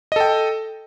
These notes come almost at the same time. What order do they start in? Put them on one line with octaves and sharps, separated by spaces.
D#5 A4 G5